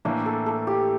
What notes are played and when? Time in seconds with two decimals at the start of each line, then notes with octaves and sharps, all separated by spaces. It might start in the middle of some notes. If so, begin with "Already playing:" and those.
0.05 A2 E3 A#3 D4
0.26 A4
0.46 A4
0.67 G4